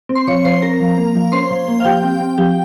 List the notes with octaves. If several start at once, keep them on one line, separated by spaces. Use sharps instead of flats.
C4
C6
F3 C#5 C#6
F3 C5 C6
C4 A#4 A#5
F3
A#3
F3
C#4 C5 C6
F3
A#3
F5
F3 G4 G5
C4
C4
F3 G4 G5